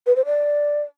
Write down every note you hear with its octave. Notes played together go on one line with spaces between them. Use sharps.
B4
C5
D5